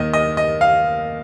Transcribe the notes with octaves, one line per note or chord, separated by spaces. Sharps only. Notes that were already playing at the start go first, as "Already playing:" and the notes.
Already playing: D#2 D#3 D#5
D#5
D#5
F5